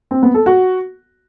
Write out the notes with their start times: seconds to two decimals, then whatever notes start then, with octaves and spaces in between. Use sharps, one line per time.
0.11 C4
0.23 B3
0.34 A4
0.46 F#4